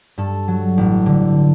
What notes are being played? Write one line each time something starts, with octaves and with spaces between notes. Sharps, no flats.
G2 A4
F#3
A1
D3